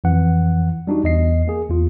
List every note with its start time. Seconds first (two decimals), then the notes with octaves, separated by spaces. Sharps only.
0.04 F2 E3 F#5
0.87 G3 D4 D#4 F#4
1.04 E2 D#5 C7
1.48 A#3 G#4
1.69 E2 F4